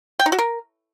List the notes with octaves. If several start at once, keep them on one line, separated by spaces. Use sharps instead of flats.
G5
D#4
F#4
A#4